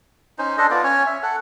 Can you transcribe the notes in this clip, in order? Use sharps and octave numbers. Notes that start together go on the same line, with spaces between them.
C#4 D#4 C5
D4 A4 C5 D#5
B3 F4 D5
C#4 C#5
E5
A4 F#5